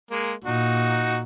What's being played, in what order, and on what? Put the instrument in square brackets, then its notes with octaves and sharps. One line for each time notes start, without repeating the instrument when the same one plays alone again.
[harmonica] G#3 A#3
[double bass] A#2 [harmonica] D#4 F#4